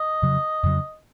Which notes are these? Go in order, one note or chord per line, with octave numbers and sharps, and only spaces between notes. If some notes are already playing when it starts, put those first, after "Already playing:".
Already playing: D#5
F2 C#3 F#3
F2 C#3 F#3